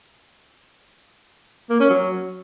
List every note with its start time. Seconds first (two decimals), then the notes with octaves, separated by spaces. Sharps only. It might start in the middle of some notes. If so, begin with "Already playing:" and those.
1.70 A#3
1.80 C#4
1.90 F#3